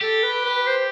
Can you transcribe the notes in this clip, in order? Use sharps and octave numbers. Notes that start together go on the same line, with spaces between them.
G4 A4
B4
B4
C5